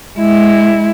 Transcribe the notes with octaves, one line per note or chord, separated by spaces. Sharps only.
G#3 E4